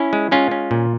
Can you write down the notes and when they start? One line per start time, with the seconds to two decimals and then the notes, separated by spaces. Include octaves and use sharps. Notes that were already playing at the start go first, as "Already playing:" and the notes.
Already playing: C#4 E4
0.13 G#3
0.31 G#3 C#4 F4
0.51 C#4
0.71 A#2